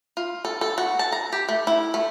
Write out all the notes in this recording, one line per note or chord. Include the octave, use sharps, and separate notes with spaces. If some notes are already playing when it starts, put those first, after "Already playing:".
F4
A4
A4
F#4
A5
A#5
G4
A3
E4
A3